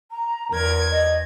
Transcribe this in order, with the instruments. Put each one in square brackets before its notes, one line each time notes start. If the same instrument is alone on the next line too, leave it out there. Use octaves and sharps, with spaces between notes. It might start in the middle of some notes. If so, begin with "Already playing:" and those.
[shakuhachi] A#5
[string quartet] E2 G#6 [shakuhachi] A#4
[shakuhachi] D#5